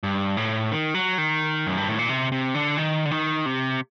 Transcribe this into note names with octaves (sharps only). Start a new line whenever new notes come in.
G2
A2
D#3
F#3
D#3
F#2
G2
A2
A#2
C3
C3
D3
D#3
D3
D#3
C3